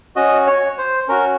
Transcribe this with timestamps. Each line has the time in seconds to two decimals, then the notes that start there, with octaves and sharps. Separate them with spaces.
0.16 C#4 F#4 D#5
0.47 C#5
0.78 C5
1.08 C#4 F#4 A#4